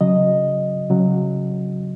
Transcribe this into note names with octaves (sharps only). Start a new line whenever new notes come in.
C#3 F#3 D#5
C#3 F#3